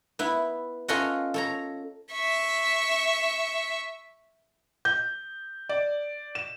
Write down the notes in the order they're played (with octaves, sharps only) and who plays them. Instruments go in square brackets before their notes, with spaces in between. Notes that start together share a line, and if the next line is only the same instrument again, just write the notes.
[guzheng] B3 E4
C#4 F4 A4 C#5 D#5 F#5
A4 C#5 A#5
[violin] E5 C#6
[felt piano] G6
D5
E7